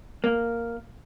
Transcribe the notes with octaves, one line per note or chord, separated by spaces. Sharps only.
A#3